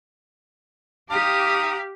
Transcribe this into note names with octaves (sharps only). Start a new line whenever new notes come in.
G4 F5 A#5 D#6